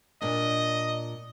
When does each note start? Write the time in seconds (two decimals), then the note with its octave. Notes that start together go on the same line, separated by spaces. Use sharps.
0.21 A#2 D4 D#5